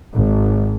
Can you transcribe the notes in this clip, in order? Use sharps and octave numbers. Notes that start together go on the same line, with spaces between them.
G#1